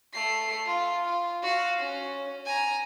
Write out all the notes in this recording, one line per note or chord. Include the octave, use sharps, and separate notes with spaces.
A3 C7
F4
F4
F#4 F5
C#4
G#5 A#5